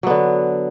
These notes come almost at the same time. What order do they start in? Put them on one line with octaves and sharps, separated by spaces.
F#3 B3 D3